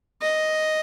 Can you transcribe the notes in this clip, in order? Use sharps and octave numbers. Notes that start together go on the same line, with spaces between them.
D#5